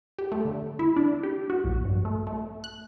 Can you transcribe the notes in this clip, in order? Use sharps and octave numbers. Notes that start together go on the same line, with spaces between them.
G4
A3
D3
E4
D4
G4
F#4
A#1
G2
A3
A3
F#6